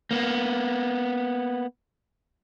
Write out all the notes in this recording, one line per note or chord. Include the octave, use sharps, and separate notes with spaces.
A#3 B3